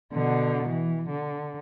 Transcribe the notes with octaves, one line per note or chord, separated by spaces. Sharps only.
B2 D3
E3
D3